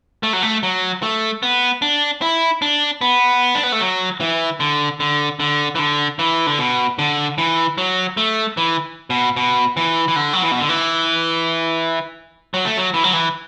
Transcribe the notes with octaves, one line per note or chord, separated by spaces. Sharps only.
A3
F#3
A3
F#3
A3
B3
D4
E4
D4
B3
D4
B3
A3
F#3
E3
D3
D3
D3
E3
D3
E3
D3
B2
D3
E3
F#3
A3
E3
B2
B2
E3
E3
D3
F#3
E3
B2
D3
E3
F#3
A3
F#3
E3
F#3
E3